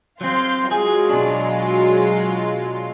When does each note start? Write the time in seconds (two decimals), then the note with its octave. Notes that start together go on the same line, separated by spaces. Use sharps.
0.21 F#3 C4 F5 C6 G6
0.71 F#3 G#3 F4 G#4
1.09 B2 D4